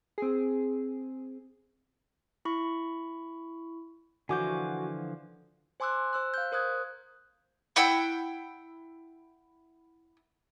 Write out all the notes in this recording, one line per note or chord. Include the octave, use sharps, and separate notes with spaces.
C4 G#4
E4 B5 C#6
D3 E3 F3 F#4 G#5 D6 G6
C5 G#5 C6 D6 E6 F#6
C5 E6 F#6
F5 G6
A#4 C5 D#6 F#6 G#6
E4 F#5 G5 E6